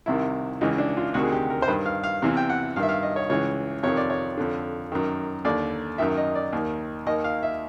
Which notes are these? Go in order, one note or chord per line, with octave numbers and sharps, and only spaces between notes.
C2 C3 D#3 E4
C#2 C#3 E3 D#4
D4
F4
D2 C3 D#3 F#4
G#4
G4
A#4
C5
G2 D#3 B4
F5
F5
E2 C3 E3 F5
G5
F#5
G2 D#3 F5
E5
F5
D#5
C#5
C#2 C#3 E3 C#5
F2 C3 D#3 C#5
D5
C#5
F2 D3
F#2 D#3
D#2 D3 D5
F#2 D#3 E5
D#5
D5
D#2 D#3
D#2 D#3 D#5
F5
E5